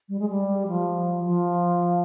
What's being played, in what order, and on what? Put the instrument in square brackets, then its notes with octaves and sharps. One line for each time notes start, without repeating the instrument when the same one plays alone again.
[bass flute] G3
G#3
G3
F3
F3